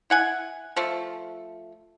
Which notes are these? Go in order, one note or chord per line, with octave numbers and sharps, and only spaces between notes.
E4 F#5 G#5
F3 A3